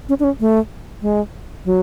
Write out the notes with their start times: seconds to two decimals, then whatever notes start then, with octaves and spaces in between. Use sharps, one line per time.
0.09 C#4
0.20 D4
0.24 C#4
0.40 A3
1.02 G#3
1.65 F#3